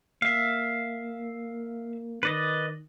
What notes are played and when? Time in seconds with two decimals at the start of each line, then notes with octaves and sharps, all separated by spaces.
0.22 A#3 E5 F5
2.23 D#3 B4 D5 D#5